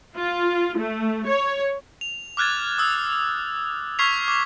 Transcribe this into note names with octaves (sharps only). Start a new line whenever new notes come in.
F4
A3
C#5
F7
D6 F6 F#6 G#6 A6
D#6 E6
C#6 F6 G#6 B6 C7 F7
D6 F7